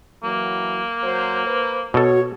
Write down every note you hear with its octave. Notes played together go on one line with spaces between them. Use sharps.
E3 F#3 A#3
F#3 C5
B4 C5
B2 F#4 A4 C#5